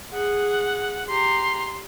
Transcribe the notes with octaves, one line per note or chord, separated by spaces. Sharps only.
G#4 F#5
G4 A#5 C6